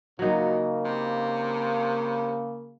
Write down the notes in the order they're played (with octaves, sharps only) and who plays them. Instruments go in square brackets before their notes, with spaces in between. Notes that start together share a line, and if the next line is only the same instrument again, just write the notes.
[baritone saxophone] A#2 [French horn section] C#3 A#3 [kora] F#3 D#4
[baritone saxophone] C3